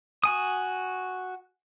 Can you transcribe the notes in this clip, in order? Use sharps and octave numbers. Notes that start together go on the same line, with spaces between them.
F#4 G#5 D#6